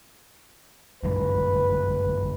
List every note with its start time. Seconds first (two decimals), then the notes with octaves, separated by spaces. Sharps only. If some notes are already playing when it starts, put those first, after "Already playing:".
1.03 G1 F#2 G#3 B4